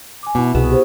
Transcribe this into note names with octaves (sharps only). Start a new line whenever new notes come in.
G#5 D6
B2 B3 E4 D6
C2 B2 B3 F#4 G#4 E7
G4 C5